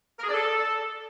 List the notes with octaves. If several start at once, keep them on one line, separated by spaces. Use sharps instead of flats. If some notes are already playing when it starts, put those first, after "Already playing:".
A#4
G#4
D5
A4